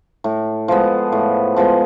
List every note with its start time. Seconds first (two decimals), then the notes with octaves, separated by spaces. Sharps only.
0.24 A2
0.68 F3 G#3 B3
1.12 A2
1.56 F3 G#3 B3